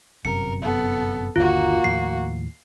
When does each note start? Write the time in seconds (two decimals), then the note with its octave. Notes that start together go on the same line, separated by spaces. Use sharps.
0.25 G1 F#2 C3 A#4 C#7
0.62 B3 A4
1.36 G1 D#2 D3 A#3 F4 F#4
1.84 D#2 A2 F3 C7